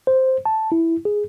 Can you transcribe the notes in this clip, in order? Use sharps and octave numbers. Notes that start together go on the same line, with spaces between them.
C5
A5
E4
G#4